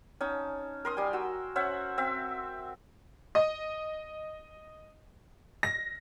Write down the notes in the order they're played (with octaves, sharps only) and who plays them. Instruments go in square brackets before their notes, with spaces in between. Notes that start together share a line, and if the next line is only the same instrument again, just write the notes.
[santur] C#4 D#4 A5
A#4 C6 D#6
G3 G#5
F#4 E6
C#4 C5 E5 F#5
C4 E5
[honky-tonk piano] D#5
A#6